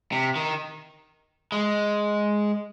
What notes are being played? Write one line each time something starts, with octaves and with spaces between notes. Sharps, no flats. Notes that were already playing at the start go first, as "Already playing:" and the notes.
C3
D#3
G#3